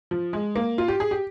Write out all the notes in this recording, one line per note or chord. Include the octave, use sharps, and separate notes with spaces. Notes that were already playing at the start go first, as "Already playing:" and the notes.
F3
G#3
A#3
F4
G4
G#4
G4